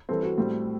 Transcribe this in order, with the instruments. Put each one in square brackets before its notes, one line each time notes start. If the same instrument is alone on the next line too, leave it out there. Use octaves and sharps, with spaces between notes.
[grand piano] E3 G3 C4 [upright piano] A4
[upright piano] F#4
[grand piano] A2 G3 C4